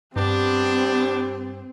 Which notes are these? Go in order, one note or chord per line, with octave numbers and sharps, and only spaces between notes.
G2 B3 C4 D4 G4